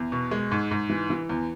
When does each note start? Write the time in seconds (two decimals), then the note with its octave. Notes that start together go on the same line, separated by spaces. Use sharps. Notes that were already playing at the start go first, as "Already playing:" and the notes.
Already playing: E2
0.12 B2
0.31 G#3
0.51 G#2
0.71 G#2
0.90 E3
1.10 E3
1.29 E2